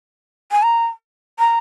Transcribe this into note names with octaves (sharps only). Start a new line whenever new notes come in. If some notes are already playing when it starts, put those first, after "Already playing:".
G#5
A#5
A#5